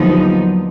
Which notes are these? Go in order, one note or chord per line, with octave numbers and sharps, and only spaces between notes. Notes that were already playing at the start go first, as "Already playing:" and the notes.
Already playing: D#2 D3 F3 F#3 B3 D#4